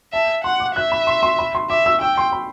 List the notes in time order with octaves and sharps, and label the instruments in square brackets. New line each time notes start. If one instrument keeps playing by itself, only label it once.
[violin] E5 [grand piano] A5
[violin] F#5 [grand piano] C6
[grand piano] D6
[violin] E5 [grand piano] F#6
[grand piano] B5
C6
C6
B5
C6
[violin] E5 [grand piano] D6
[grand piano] E6
[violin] G5 [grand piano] E6
[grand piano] C6
B5